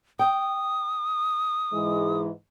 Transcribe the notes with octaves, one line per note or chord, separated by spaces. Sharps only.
G5 D#6
G#2 E3 G#3